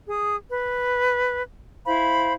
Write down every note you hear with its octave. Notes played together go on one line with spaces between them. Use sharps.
G#4 D#6
B4
E4 C5 F5 B5